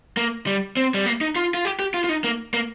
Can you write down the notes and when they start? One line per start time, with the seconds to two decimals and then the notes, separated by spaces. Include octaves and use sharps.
0.17 A#3
0.47 G3
0.77 C4
0.94 G3
1.06 A#3
1.21 D#4
1.36 F4
1.54 F4
1.65 G4
1.79 G4
1.94 F4
2.04 F4
2.09 D#4
2.24 A#3
2.54 A#3